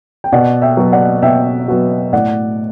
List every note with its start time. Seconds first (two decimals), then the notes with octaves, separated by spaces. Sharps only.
0.24 G5
0.32 B2 D5 F#5
0.62 E5 G5
0.77 F#3 B3 F#4
0.92 D5 F#5
1.22 B2 E5 G5
1.68 F#3 B3 F#4
2.13 A2 D5 F#5